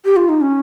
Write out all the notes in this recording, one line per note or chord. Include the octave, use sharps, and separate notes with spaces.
G4
F4
D#4
C#4